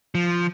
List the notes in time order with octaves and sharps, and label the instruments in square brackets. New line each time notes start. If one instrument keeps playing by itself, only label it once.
[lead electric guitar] F3